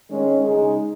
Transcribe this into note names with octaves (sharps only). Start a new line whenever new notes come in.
D#3 G#3 C#4
C#3 G#3 D#4 G#4